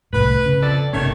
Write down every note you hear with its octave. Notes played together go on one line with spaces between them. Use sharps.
C2 A2 B4
C#3
F2 A4 D5
G1 C3 D#3 A3 C#4 C#5